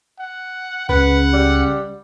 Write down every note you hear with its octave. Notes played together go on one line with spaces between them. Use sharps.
F#5
C#2 C#3 B4 F#5
G3